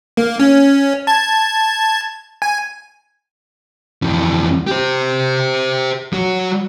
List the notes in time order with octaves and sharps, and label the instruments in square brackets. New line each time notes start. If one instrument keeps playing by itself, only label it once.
[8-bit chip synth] A#3
C#4
A5 G#6
G#5
[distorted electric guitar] F2 E3
G4 C5
F#3 F#4